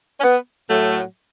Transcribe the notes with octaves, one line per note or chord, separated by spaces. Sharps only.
C#4
B3
A2 F#3 A3